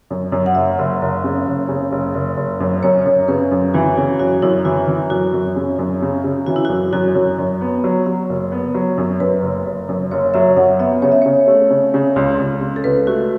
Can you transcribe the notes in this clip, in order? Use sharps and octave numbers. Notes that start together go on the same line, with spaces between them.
F#2
F#2
F#5
F#1 E5
F#1
F#1
C#3
F#1
C#3
F#1
F#1
F#1
F#2
F#2 C#5
F#2
C#3 B4
F#2
E3 F#4
C#3 F#4
F#2 F#4
F#2 E4
E3 F#4
E3
F#2 F#4
F#2
C#3
F#2
C#3
C#3
E3 F#4
E4
F#2 F#4
F#2 F#4
F#2
F#2
B3
F#3
F#3
F#1
B3
F#3
F#2
F#2 B4
F#1
F#1
F#2
F#1 C#5
F#3 E5
F#2 F#5
B3 E5
C#3 C#5
E5
C#3 C#5
A3
C#3
C#3
C#2
C#2
C#3
A4
C#2 B4
A3 F#4